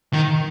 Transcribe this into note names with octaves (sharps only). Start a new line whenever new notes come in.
D#3